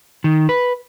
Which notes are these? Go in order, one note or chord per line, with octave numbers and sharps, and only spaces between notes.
D#3
B4